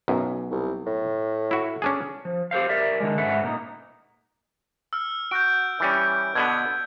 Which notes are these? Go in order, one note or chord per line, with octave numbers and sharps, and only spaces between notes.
B1 F#2
C2
A2
E4 F#4
C#4 D4 G#4
F3
G4 A4 C5 F5
G4 A#4 D5 E5
D3 D#3 G#3
G#2 C#4 A4 B4 E5 F#5
A#2 A#3 D#4
E6 F6
F#4 G6 D7
E3 G3 C#4
B2 D3 B3 G#6